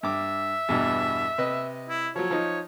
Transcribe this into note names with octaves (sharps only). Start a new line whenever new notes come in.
G2 E5 D6
E2 G2 B2
C3 B4 D#5
E4
F3 F#3 C#5
F3 D#4